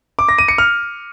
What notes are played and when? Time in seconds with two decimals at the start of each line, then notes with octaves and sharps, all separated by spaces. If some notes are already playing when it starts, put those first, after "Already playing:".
0.19 D6
0.29 A#6
0.38 D#7
0.48 C#7
0.58 F6